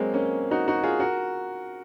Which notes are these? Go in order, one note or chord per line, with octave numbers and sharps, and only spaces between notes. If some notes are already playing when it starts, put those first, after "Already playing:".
Already playing: F#3 G#3 A#3 C4
A#3 C#4
D#4 F#4
D#4 F#4
F4 G#4
F#4 A#4